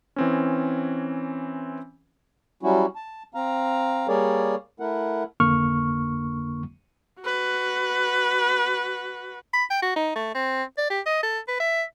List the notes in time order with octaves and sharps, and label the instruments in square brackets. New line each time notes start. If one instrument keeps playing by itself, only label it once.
[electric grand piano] E3 C4 C#4
[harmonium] F#3 G3 C#4 E4 F#4
A5
C4 F5 A#5
G3 A#3 G#4 A#4 C#5 D5
A3 E4 A#4 F#5
[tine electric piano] G#1 F2 D3 A#3 C#6 F6
[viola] F#4 B4
[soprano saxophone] B5
G5
F#4
D#4
A3
C4
D5
G4
D#5
A4
B4
E5